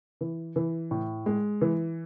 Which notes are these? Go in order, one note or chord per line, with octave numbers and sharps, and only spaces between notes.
E3
E3
A2
G#3
E3